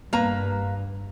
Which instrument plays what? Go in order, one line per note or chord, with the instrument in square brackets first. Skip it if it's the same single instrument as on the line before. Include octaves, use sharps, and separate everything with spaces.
[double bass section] G2 [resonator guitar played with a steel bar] A#3 B4 A#5